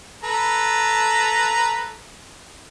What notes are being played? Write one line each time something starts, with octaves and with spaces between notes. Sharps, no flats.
A4 B4 A#5